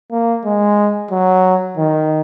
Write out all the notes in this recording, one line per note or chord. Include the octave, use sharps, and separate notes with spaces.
A#3
G#3
F#3
D#3